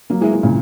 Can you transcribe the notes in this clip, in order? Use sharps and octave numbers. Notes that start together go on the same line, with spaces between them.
F#3 A#3
E3 G#3
E3 G#3
A#2 C#3